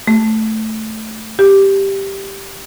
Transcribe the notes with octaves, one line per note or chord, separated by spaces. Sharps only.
A3
G4